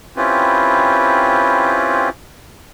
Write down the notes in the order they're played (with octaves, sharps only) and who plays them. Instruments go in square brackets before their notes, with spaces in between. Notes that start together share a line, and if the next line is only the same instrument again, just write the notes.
[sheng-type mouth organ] C4 C#4 E4 F4 G4 B4